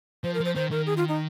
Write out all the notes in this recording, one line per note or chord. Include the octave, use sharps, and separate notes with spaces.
F3 C5
A#4
F3
C5
D#3 C5
D#3 A#4
G#4
F4
D#4